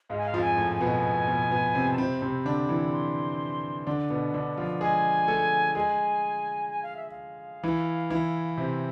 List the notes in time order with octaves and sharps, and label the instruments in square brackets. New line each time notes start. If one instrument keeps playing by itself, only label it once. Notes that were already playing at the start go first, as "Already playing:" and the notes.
[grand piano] G#2 G#3 [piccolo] F5
[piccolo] G#5
F5
[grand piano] F2 F3
[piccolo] G#5
[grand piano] A2 A3
[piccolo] G#5
[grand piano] B2 B3
B2 B3
B2 B3
C3 C4
[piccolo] A5
[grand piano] C3 C4 [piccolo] B5
[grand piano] C3 C4
D3 D4
E3 E4
[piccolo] C6
[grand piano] D3 D4
B2 B3
D3 D4
F3 F4
[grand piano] G#3 G#4 [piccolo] G#5
[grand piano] A3 A4
[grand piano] G#3 G#4 [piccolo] G#5
[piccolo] G#5
F5
E5
F5
[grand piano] E3 E4
E3 E4
[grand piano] C3 C4 [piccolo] E5
[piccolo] E5